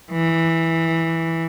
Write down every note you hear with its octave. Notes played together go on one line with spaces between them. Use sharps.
E3